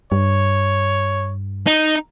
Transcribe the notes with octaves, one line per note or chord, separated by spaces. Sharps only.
G2 C#5
D#4